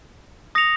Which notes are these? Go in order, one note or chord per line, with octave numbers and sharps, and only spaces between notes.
D#6 A#6 C#7 F7